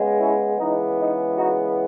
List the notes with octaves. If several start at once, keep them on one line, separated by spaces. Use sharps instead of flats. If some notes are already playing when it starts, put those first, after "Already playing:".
Already playing: C#3 G#3 B3
C#4 E4
C#3 E3 G#3 B3 D#4
D#4
D#4 F#4